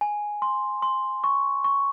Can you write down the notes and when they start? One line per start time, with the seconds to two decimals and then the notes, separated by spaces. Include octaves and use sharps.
0.01 G#5
0.42 C6
0.82 C6
1.24 C#6
1.64 C#6